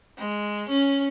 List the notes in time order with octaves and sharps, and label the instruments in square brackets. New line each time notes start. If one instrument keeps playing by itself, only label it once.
[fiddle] G#3
C#4